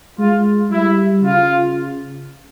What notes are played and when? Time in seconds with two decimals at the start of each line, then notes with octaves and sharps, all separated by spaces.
0.19 G#3 F4
0.71 G3 E4
1.23 C#3 F4